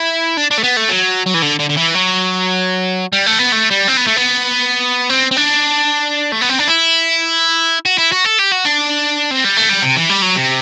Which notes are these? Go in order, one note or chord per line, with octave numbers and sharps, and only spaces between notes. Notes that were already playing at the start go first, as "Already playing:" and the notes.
Already playing: E4
D4
D4
A3
B3
A3
F#3
F#3
E3
D3
D3
D3
E3
F#3
G3
A3
B3
A3
G3
C4
B3
A3
B3
C4
C4
D4
A3
B3
C4
D4
E4
F#4
E4
F#4
A4
G4
F#4
D4
C4
G3
A3
G3
C3
E3
G3
F#3
C3